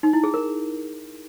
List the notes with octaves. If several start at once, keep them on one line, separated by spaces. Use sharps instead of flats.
D#4
E4
G#4
A#4